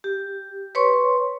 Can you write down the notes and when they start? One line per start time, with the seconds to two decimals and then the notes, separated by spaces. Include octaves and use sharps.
0.04 G4
0.75 B4 C#5 C6 C#6